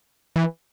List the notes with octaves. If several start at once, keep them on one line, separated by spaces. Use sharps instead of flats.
E3